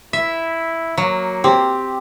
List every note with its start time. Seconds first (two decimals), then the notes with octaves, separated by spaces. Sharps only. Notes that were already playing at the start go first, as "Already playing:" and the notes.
0.13 E4 E5
0.98 F#3 A#3
1.44 C4 G4